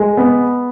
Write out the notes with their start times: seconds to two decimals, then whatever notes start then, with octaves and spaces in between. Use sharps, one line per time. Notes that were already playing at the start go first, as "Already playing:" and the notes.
Already playing: G#3
0.17 B3